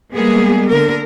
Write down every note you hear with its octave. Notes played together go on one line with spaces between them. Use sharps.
G3 G#3 A#3 B3 G#4
D3 A#4